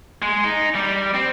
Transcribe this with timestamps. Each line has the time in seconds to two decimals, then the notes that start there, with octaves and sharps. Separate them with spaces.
0.22 G#3
0.44 D#4
0.75 G3
1.14 C4